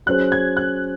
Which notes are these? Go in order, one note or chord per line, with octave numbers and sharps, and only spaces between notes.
F#3 C#4 G#4 C5 F#6
G#6
F#6